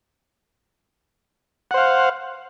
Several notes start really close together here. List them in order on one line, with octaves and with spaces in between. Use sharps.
F#5 C5 F5